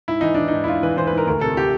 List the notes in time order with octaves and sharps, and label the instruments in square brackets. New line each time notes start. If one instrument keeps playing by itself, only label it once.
[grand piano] G#2 E4
E3 D#4
E3 D4
G#2 D#4
E4
G#2 F4
E3 B4
E3 C5
B4
G#2 A#4
D2 A#4
C3 A4
G4